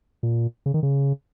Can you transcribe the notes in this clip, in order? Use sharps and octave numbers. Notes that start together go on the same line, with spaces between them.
A#2
C#3
D#3
C#3